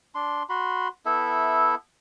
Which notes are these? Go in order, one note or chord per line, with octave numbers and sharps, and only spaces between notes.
D4 C6
F#4 B5 C6
B3 E4 A4 E5